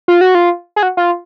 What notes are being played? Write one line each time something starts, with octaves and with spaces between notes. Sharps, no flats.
F4
F#4
F4
G#4
F#4
F4